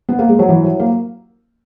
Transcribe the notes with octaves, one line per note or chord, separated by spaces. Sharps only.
B3
A#3
G#3
F#3
E3
F#3
A#3